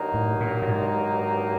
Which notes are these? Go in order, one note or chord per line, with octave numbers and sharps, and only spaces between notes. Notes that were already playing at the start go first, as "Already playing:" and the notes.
Already playing: G2 D#3 F#3 A#3 D#4
A2
A#2
A2
G#2